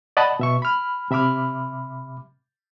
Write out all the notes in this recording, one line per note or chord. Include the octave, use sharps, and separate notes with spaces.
D5 D#5 F#5 A5 B5
B2 E5 C#6
B5 F6
C3 E5 B5 D6 F6